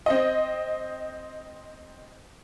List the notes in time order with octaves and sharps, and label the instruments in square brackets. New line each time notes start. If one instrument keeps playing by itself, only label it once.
[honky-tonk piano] C4 D#5